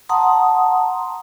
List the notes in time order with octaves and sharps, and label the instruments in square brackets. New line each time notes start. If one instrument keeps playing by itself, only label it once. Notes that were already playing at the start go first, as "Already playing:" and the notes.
[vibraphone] F#5 A5 A#5 C6 D#6